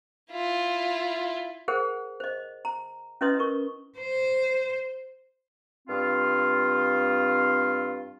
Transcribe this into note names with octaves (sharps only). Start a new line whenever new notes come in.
E4 F4
G#4 A#4 C5 F#5
C5 D#5
A#5
C#4 E4 B4 D#5 C6 D#6
A#4 C#6
C5
G2 C4 F4